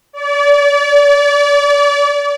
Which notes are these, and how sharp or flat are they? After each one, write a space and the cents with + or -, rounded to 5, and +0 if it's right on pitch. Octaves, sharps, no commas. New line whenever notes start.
D5 -35